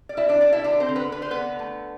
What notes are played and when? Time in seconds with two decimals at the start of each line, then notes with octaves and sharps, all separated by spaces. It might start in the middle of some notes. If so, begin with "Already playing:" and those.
0.09 D5
0.17 B2 E4 E5
0.29 D4 D5
0.41 B2 D4 D5
0.52 E4 E5
0.64 D3 D4 D5
0.80 C4 C5
0.89 D3
0.96 B3 B4
1.12 D3 B4
1.22 C5
1.31 D3 B3 B4
1.59 A3